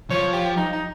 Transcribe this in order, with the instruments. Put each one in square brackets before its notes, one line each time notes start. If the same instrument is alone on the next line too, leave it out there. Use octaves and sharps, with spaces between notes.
[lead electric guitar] F3 [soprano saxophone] C#5
[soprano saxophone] G4
D#4
D#4